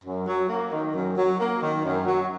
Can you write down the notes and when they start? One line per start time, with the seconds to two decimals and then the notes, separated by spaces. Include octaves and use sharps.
0.05 F#2
0.27 F#3
0.49 A#3
0.72 D#3
0.95 F#2
1.17 F#3
1.39 A#3
1.62 D#3
1.84 F#2
2.06 F#3